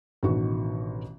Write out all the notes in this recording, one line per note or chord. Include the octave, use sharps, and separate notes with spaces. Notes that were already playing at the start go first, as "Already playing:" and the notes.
A1 B2 D3 D#3 F#4 C#6